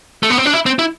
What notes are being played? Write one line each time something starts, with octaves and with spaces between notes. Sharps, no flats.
A3
B3
C4
D4
E4
C4
E4